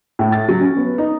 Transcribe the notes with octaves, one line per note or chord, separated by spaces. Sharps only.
A2
A6
F#3
C#4
B3
D#4